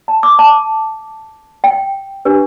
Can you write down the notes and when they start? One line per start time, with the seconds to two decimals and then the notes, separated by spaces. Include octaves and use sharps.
0.08 A5
0.23 D6
0.39 A5
1.64 G5
2.25 D4 G4 B4